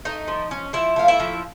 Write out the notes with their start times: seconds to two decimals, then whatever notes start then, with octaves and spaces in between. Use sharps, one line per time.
0.05 A3 D#4 D#5
0.28 F3
0.51 C#4
0.73 F3 E4 E5
0.96 A3 F5
1.08 E4 E5
1.20 F3